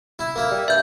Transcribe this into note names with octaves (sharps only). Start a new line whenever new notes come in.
E4
A#3 E4
G3
G2 E5 G6